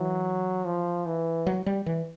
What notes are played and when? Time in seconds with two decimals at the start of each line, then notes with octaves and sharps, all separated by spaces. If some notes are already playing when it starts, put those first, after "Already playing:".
Already playing: E3 F#3
0.65 F3
1.06 E3
1.47 F#3
1.66 G3
1.86 E3